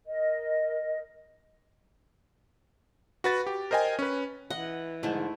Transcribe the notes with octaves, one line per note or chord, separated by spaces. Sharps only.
A#4 D#5
F#4 B4 A6
G4
A#4 C5 D#5 G5 G#5
C#4 B4
E3 D#5 F#5
G#2 D3 D#3 F3 A3 E4